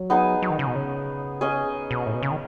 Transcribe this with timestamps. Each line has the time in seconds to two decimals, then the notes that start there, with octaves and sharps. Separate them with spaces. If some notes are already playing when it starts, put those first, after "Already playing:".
Already playing: F#3
0.10 B3 D#4 G#4
0.42 F#3
0.50 D#3
0.59 C#3
0.67 B2
0.75 C#3
1.41 C#4 G#4 D#5
1.91 B2
2.06 A2
2.15 B2
2.23 C#3
2.31 D#3